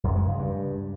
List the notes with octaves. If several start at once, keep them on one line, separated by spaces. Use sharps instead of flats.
F#2
G#3
C#3
G2